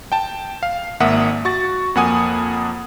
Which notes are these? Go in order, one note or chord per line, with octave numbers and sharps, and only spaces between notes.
G5 A5
F5
G#1 A#3 E5 F#5 D#6
F#4 C#6 A6
F2 A#3 F#5 G#5 D#6